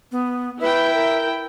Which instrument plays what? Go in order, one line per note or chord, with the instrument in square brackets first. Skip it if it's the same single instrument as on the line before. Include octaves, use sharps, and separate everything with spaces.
[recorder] B3
[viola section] E4 G5 [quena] B4 [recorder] E5
[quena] A#4